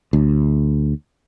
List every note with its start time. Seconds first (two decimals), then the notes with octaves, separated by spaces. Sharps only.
0.13 D2